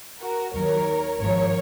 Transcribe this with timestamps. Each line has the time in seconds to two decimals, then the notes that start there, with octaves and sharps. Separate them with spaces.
0.20 F#4 A#4
0.53 D#2 D#3 F#3 A#4 C#5
1.20 G#1 G#2 F3 A#4 C#5